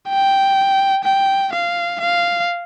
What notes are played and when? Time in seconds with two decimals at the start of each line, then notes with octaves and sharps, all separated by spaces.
0.09 G5
1.04 G5
1.53 F5
2.00 F5